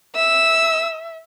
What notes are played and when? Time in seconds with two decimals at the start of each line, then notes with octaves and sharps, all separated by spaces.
0.15 E5 E6